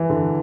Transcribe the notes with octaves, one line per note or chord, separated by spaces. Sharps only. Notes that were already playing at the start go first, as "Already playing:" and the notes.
Already playing: E3
D3